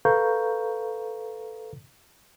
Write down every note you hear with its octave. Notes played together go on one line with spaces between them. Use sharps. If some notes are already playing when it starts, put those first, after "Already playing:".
A4 B4 F5 A#5 C#6 G6